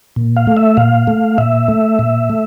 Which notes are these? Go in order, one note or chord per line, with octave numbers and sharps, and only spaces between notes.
A#2
F5
A3
E5
A#2 F5
A3
A#2 E5
A3
A#2
A3